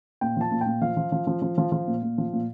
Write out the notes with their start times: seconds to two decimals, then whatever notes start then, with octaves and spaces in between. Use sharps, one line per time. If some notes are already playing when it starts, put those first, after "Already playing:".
0.21 A#2 G5
0.37 F3 A5
0.51 A#2
0.61 G5
0.66 A#2
0.81 F3 F5
0.97 F3
1.12 F3
1.27 F3
1.42 F3
1.58 F3
1.72 F3
1.87 A#2
2.02 A#2
2.18 F3
2.33 A#2